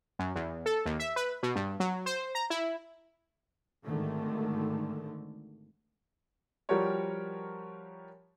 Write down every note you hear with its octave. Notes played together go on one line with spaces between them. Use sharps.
F#2
E2
A4
D#2
E5
B4
B2
G2
F#3
C5
A#5
E4
G#1 G#2 D3 D#3 A3
F3 G3 F#4 G4 A#4 C#5